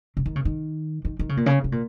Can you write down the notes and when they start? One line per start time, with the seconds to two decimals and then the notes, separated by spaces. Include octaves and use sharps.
0.17 C#3
0.26 D#3
0.36 C#3
0.45 D#3
1.05 D#3
1.19 D#3
1.29 C#3
1.37 A#2
1.46 C#3
1.64 C#3
1.72 A#2